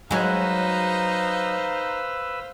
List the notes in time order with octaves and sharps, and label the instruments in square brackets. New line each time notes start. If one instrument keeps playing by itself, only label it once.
[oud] F#3 G#3 [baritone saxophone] D#4 [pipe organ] B4 E6 [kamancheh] C5 F5